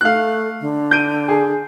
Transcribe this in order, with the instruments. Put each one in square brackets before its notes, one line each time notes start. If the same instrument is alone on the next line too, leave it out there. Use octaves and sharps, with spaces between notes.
[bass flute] A3 [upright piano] F5 F#6
[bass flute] D3
[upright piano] G6 D7 D#7
G#4